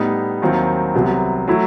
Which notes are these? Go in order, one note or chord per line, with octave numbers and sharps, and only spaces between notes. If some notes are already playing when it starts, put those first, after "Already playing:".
Already playing: A2 G3 B3 D#4
D#2 D#3 F#3 C4 E4
C2 C3 F#3 B3
F#3 A3 E4